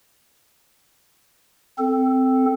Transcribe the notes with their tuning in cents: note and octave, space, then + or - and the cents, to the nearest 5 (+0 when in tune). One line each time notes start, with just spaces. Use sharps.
C4 -10 A4 +0